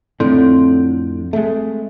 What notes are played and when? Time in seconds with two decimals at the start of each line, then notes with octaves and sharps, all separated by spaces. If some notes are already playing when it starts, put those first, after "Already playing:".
0.20 F2 A2 D3 C4
1.33 G#3 A3